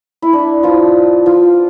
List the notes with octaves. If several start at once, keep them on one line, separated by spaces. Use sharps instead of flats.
E4
D4
F3 F4
F3 F4